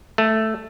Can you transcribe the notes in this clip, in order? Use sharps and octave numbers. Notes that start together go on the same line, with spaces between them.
A3